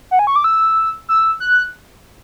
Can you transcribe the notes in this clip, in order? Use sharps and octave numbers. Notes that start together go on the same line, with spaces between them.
F#5
G#5
C#6
D6
E6
E6
F#6